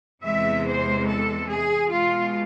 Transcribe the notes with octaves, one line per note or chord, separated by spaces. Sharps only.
E2 C3 E3 G#3 E5
C5
A4
G#4
B2 G#3 F4